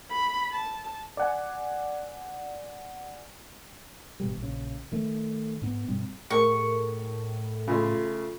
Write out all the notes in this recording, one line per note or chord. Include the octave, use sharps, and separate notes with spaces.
B5
A5
D5 F#5 G#5
G#1 B2 G3
A#1 C#3
D#3 A3
G#2 B3
G2 B2 G3 C4
A2 G#4 A#4 C#6
C#3 A3 F4 C6